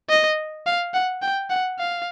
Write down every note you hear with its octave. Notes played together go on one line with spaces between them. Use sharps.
D#5
F5
F#5
G5
F#5
F5